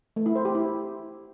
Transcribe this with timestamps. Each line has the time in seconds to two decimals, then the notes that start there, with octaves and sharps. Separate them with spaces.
0.16 A3
0.26 E4
0.36 C5
0.45 G4
0.55 E4